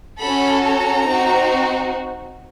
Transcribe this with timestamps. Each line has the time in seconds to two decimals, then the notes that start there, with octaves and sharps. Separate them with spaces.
0.20 C#4 F#4 A4 B5
0.64 A#5
1.06 C4 D#4 F#4